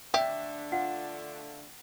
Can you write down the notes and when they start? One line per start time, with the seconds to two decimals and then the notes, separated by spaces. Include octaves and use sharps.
0.14 D3 A3 D4 G4 E5
0.72 F4 F#5